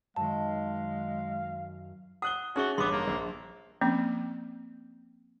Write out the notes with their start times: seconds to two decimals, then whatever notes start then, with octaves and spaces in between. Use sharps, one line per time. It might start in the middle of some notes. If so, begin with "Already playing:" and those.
0.16 F#2 D#3 G#3 F5 A5
2.22 F#5 D#6 F#6 G7
2.56 C#4 D#4 F#4 G#4 E5 G7
2.78 A1 G2 B3 C6 D6
2.91 A#3
3.07 A#1
3.81 F3 A#3 C4 C#4